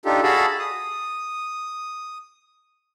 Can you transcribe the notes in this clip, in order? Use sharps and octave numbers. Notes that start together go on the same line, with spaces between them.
D4 D#4 F4 G4 A4
F#4 G#4 A4 F5 A5 B5
D#6